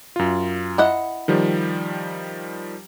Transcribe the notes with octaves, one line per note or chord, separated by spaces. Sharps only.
F#2 F4
E4 D#5 F#5
D#3 F3 G3